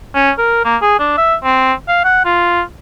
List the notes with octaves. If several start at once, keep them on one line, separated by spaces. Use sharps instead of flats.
C#4
A#4
A#3
G#4
D4
E5
C4
F5
F#5
F4